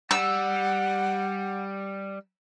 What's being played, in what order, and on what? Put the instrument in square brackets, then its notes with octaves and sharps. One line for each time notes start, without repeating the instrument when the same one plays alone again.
[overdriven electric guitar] G3 [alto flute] F#5 [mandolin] E6